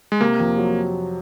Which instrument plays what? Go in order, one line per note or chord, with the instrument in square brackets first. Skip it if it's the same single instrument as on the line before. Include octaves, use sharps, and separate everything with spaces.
[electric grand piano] G#3
[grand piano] C3 [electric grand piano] A#3
[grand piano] F2
F#3